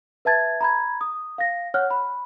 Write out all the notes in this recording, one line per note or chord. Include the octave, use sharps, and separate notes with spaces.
B4 E5 A5 G#6 A6
A#5 B5 G#6
D#6
F5 A#6
C#5 F#5 F6 F#6
B5